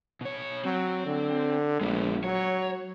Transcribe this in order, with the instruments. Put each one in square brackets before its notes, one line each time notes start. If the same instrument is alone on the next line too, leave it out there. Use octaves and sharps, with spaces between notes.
[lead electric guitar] B2 C#5
[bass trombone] F#3 [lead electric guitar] C4
[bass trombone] D3
[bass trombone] A#1 [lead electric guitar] G#3 B3
[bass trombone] F#3 [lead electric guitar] C#5